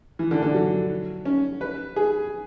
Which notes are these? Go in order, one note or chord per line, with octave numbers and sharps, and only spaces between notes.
E3
D3
D3
F#3
C#4
B4
G#4